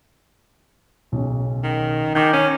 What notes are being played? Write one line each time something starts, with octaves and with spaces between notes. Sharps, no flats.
B1 C#3
D#3
D#3 G#5 D6 G6
C#4